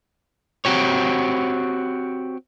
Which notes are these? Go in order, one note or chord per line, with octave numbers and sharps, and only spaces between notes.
C4 F#4 G4 C#5